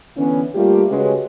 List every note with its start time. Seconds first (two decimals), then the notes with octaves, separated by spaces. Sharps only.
0.16 D3 E3 B3 C#4
0.55 G3 A3 A#3 F4 G4
0.89 C#3 G#3 C#4 F#4 G4 B4